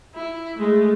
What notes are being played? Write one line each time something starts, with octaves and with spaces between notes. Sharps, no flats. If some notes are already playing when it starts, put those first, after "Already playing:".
E4
G#3 A3